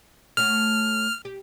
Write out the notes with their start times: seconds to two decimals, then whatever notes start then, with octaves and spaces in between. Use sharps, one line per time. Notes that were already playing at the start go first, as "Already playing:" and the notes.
0.37 A3 C#4 F#4 F6
1.25 G4